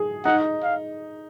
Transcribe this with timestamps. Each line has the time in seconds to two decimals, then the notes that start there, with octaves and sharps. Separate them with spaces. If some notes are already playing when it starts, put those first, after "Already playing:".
Already playing: G#4
0.25 D#4 F#5
0.63 F5